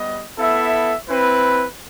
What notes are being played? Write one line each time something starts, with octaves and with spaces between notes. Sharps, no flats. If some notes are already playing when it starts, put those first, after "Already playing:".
Already playing: G3 B3 D#5
B3 E4 A4 E5
C4 E4 B4